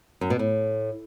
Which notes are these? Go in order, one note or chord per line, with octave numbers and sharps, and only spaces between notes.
F#2
B2
A2